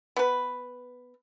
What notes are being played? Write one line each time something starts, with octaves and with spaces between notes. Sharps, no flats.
B3 B4